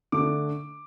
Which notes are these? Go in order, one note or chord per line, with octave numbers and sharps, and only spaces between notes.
D3 A3 D4 D6